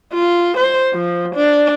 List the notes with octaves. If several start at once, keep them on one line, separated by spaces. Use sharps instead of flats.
F4
C5
F3
D4